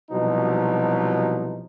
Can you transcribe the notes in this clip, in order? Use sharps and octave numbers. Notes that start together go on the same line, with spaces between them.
C2 B2 F3 F#3 D#4